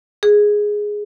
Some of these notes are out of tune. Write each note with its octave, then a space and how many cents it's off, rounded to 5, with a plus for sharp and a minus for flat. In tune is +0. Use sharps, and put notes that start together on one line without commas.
G#4 +0